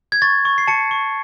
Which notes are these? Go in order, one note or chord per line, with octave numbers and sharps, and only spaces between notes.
G#6
C#6 A6
C#6
C7
A5 C#7
C#6